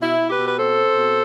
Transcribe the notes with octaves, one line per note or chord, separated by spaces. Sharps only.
B2 E4
B2
G4 B4
B2
B4
C4 A4 C5
C4
B2